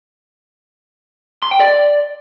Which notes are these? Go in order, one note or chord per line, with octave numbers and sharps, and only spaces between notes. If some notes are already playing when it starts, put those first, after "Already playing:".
C6
G5
D5